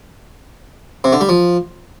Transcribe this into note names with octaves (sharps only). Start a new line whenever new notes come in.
C3
D3
G3
F3